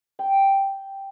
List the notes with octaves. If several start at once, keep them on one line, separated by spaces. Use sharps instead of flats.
G5